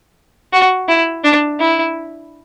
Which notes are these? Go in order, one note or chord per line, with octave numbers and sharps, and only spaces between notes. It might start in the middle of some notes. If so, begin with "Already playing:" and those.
F#4
E4
D4
E4